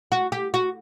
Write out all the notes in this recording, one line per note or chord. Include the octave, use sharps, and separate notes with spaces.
F#4
G4
F#4